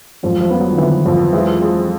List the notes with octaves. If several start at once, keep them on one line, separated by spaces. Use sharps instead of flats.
F2 F#3 G#3
F3 G3
B3
E3 F#3
D#3
D3 E3 B3
F2
E3 F#3 G#3
G#3